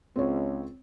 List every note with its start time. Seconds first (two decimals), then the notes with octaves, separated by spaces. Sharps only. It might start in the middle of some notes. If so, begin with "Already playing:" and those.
0.16 C#2 C4 C#5